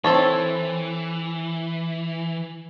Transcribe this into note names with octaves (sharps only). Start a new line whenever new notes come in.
E3 C4 A4 C#5